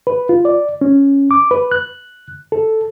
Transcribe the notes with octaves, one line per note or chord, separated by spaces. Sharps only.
B4
F4
D5
C#4
D6
B4
F#6
A4